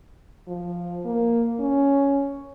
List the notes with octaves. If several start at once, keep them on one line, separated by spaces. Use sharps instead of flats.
F3
A#3
C#4